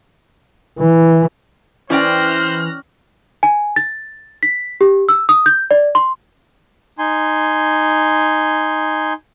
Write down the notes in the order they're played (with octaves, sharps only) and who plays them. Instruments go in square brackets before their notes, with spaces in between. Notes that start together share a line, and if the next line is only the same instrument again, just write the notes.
[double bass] E3
[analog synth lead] E3 [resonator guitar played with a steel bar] C#4 D5 G5 [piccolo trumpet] C5 [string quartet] F6 F#6 A#6
[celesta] G#5
A6
B6
G4
E6
D#6
G6
D5
C6
[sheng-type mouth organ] D#4 G#5 C6